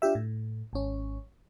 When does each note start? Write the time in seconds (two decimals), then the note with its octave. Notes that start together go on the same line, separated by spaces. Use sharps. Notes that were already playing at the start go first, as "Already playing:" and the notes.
0.02 D4 F4 G4 E5
0.15 A2
0.73 G#1 C#4